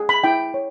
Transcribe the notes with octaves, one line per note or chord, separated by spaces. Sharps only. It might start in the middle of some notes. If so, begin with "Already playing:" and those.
Already playing: G#4
B5
E4 G5
C#5